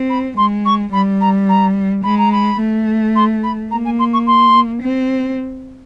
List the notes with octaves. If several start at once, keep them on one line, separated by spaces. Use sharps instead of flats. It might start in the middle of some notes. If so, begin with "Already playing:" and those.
Already playing: C4
B5
G#3 C6
C#6
G3 B5
A#5
A#5
G#3 B5
A#5
B5
A3
C6
B5
A#3 A#5
G#5
C6
C#6
C6
C4